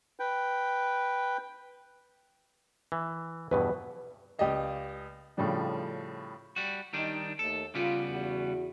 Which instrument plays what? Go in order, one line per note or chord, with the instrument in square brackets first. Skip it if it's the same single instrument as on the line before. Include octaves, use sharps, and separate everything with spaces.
[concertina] B4 G5
[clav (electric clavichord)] E3
[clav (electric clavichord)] E2 G2 B2 [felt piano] B4
[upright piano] C#2 G4 D5 D#5 F5
A2 C#3 F3 G3 D4
[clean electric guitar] G3 F#4
[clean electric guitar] D#3 G3 D4 [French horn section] D#4
[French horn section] D#2 A3 [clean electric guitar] A4
[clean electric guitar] C#3 G3 B3 [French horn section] F4
[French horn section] E2 F#4